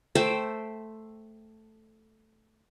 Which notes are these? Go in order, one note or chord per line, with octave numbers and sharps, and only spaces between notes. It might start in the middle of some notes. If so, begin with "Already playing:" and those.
A3 C5 E5 G5